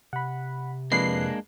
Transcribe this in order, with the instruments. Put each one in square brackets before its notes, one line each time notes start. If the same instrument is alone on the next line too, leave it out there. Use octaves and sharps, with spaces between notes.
[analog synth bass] C3 [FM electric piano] F#5 B5
[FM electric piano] F2 B4 F#6 [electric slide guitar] G#3 A#3 D4 [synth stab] C7